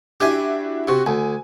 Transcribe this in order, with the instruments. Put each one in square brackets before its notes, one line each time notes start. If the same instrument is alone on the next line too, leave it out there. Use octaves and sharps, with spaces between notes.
[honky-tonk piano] D4 E4 F#4 [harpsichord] G4 G#5
[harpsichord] C3 [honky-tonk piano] F#4 C#6
[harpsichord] D2 [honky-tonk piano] G#5